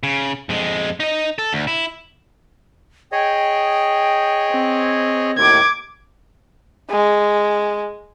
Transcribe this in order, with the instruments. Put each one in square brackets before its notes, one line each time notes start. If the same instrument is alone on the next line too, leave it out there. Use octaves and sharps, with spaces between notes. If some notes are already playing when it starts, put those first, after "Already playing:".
[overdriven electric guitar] C#3
F2 G#3
D#4 D#5
A4
D2
E4
[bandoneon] G#4 C#5 D#5 [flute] G5
[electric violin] C4
[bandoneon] D#2 A2 D#3 [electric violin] D6 G#6
[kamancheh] G#3